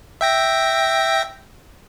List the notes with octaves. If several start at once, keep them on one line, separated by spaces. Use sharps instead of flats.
E5 G5 A#6